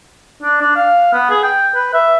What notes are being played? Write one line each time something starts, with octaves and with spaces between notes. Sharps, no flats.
D4
D4
F5
B3
G#4
G5
B4
E5